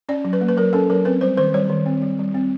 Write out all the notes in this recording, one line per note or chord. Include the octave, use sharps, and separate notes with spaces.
C#4 D5
F#3
B4
A#3
B4
F#3 A#4
C#4 A4
F#3 A#4
C4 B4
G3 C5
D#3 C5
G3 C#5
D#3
C4
G3
G3
C4